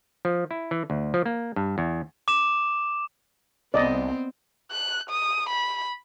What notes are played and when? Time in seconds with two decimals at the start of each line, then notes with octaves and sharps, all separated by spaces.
0.25 F3
0.51 E4
0.71 E3
0.90 D2
1.14 F3
1.26 A#3
1.56 G2
1.78 E2
2.28 D6 E7
3.74 C2 B3 C4 D5 D#5
4.72 F#6
5.10 D#6
5.49 B5